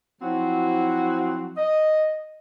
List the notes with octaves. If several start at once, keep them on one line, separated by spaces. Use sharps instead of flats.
F3 F#3 C4 E4 F#4
D#5